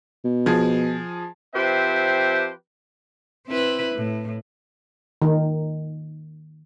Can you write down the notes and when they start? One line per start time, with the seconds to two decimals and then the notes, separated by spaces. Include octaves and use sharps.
0.24 B2
0.46 F3 G#4
1.55 F3 C4 G4 B4 C5 E5
3.48 C4 E4 B4
3.96 A2
5.22 D#3